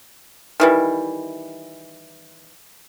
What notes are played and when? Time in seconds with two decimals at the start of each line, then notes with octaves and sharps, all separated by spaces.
0.60 D#3 E3 G3